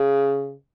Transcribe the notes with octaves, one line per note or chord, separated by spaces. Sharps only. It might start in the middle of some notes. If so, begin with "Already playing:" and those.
Already playing: C#3